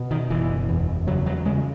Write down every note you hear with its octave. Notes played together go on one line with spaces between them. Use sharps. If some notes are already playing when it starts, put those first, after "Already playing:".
Already playing: B2
D#3
F#1 E3
E2
C#3 F#3
F#3
C#3 G#3